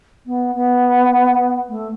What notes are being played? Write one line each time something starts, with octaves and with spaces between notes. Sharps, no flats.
B3
B3
A3